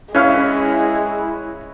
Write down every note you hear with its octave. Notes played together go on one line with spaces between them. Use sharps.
G#3 C#4 E4 B4 C#5 E5 F5 F6